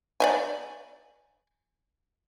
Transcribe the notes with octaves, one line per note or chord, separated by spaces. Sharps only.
D5 E5 G#5